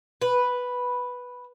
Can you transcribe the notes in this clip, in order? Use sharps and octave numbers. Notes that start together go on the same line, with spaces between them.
B4